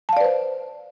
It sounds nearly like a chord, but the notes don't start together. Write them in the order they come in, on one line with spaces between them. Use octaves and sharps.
A5 F5 D5 B4 C5